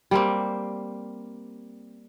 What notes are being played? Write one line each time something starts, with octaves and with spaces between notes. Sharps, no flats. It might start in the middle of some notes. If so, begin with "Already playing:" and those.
G3 A#3 C4